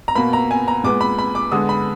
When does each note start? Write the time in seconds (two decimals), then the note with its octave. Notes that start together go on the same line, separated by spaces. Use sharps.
0.08 A#5
0.15 B2 A#3 B5
0.33 A#5
0.51 G#5
0.68 A#5
0.84 A#2 G#3 B3 D6
1.01 B5
1.18 B5
1.35 D6
1.52 D3 G#3 B3 D#6
1.69 B5